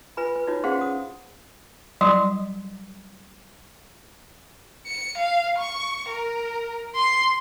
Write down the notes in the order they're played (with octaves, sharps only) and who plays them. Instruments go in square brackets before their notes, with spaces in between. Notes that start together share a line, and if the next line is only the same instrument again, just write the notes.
[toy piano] F4 B4 G#5 B5
B4
D#4 F4 F#4 C#5
C#4 G#4 C5 F5 F#5 C6
D#6
[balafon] F#3 G3 D#5 C6
[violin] C#7
F5
C#6
A#4
C6